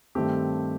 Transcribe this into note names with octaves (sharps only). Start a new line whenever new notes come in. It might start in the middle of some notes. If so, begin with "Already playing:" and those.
G2 D#3 A3 C4 G4